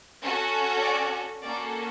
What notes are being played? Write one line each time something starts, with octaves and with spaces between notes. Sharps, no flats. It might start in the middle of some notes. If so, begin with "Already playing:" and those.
C#4 F#4 A4
D5
A#3 C#4 F#4 A4 D5